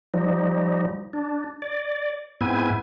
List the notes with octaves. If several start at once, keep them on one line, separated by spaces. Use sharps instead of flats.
F3 G3 D#4
D4
D5
G#2 B3 C4 E4 G#5